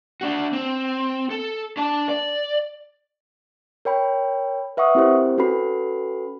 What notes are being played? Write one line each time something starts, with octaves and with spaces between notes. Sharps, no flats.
D4 F#4
C4
A4
D4 A5
D5
A#4 C#5 G5 B5
B4 E5 F#5 C#6 D#6
C4 E4 G4 A#4 C5
C#4 F#4 A4 B4 B5 C7